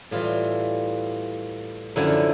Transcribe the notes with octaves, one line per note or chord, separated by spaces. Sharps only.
A2 E3 G3 F4
F#2 D3 F3 A3 E4